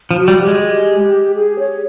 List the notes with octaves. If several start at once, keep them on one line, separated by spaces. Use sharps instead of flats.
F3
F#4
G3
G4
G#3
G4
G#4
C#5